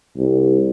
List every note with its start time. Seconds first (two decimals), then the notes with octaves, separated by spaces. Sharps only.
0.17 C2